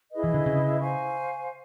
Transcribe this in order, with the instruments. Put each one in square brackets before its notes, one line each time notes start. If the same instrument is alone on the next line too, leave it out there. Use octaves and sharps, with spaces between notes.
[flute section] E4 G#4 B4 D#5
[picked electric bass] E3
D3
C#3
[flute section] C5 F5 G#5 C#6